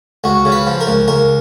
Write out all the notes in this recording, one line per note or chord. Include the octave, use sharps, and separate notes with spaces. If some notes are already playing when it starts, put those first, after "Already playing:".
C#2 F#4
C#3
B4
F3
A#4
C#2
C#2 A#4